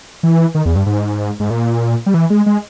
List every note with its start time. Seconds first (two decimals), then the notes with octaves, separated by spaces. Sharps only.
0.23 E3
0.55 D#3
0.65 E2
0.76 G2
0.86 G#2
1.40 G#2
1.50 A#2
2.06 G3
2.14 E3
2.30 G#3
2.46 G#3